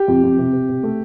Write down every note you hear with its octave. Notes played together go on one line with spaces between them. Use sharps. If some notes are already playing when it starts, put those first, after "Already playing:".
Already playing: G4
F2
F2
C3
C3
C3
A3